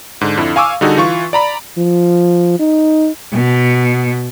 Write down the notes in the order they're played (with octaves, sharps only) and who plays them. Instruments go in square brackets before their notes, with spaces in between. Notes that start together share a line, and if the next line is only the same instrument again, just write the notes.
[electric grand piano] G#2 D3
F2 D3 E4
F5 G#5 C#6 D6 E6
D3 G3 D#4 F#4 G#4 A4
E3 F4 C#6
D5 A#5 B5
[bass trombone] F3
D#4
[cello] B2